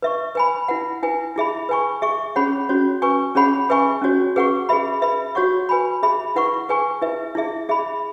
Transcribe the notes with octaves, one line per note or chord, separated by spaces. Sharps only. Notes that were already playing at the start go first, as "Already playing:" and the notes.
B4 E5 C#6
B4 G#5 B5
E4 B4 F#5
E4 B4 G#5
E4 G#4 E5 B5
B4 G#5 C#6
G#4 E5 C#6
C#4 G#4 C#5 F#5 B5
C#4 F#4 C#5
B4 G#5 C#6
C#4 G#4 C#5 F#5 B5
G#4 B4 E5 G#5 C#6
C#4 F#4 C#5
G#4 B4 F#5 C#6
G#4 B4 E5 B5
B4 E5 B5
F#4 C#5 F#5 C#6
B4 G#5 B5
G#4 E5 B5
E4 B4 F#5 C#6
G#4 B4 G#5 C#6
E4 B4 E5
E4 G#4 E5
G#4 E5 B5